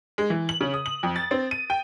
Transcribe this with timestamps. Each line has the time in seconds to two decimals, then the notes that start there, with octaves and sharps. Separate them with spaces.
0.18 G#3
0.30 E3
0.49 F#7
0.61 C#3
0.74 D#6
0.86 F#7
1.03 F2
1.16 A6
1.31 C4
1.51 D#7
1.70 G5